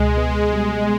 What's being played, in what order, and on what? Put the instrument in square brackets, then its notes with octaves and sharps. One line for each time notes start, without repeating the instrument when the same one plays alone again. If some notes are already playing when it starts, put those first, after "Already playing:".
Already playing: [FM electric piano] C#2 B2 [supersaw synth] G#3
[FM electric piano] B3
G3